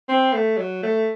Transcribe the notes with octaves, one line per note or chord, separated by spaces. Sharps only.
C4
A3
F#3
A3